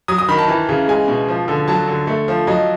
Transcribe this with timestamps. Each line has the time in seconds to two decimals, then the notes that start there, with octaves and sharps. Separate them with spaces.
0.08 F#3 D#6
0.18 D#6
0.28 D#3 B5
0.38 A5
0.48 E3
0.69 C#3
0.88 G#3 G#5
1.08 B2
1.28 F3
1.48 D3
1.68 F#3 A5
1.88 D3
2.07 A3
2.28 F3
2.47 F#3 D#5